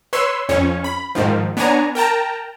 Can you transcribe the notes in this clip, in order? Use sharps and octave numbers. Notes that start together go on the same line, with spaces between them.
B4 C#5 C6 E6
F2 C#4 C#5
B5
G#2 D#3 F3
B3 D4 C#5 G#5 A#5
A#4 G5 A5 A#5